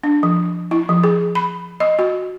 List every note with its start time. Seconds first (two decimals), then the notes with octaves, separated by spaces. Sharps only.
0.04 D4
0.23 F3
0.71 E4
0.89 F3
1.04 G#4
1.35 B5
1.80 D#5
1.99 F#4